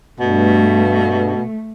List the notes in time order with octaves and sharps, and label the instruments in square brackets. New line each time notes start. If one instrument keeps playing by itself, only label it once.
[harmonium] G2 [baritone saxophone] B2 [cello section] A3